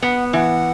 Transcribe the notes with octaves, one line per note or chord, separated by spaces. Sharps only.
B3 F#5
E3 F#5